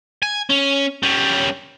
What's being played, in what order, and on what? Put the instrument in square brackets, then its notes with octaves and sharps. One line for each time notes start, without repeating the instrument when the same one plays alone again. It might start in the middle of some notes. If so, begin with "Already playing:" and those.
[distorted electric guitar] G#5
C#4
G3 C#4